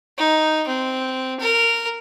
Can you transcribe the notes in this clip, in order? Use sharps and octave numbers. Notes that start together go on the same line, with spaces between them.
D#4
C4
A#4